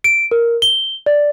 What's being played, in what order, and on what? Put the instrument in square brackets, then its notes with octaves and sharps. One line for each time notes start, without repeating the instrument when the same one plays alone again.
[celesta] D7
A#4
G7
D5